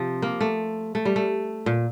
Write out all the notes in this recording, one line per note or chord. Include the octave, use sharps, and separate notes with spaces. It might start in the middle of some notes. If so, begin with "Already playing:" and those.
Already playing: C3 F3
A#3
A3
A3
G3
A3
A#2